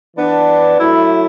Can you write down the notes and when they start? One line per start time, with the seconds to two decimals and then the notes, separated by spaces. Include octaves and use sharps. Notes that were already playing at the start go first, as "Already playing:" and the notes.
0.15 E3 B3 D4
0.77 F#3 A3 E4